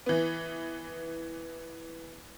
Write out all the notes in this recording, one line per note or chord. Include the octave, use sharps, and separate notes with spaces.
E3 B3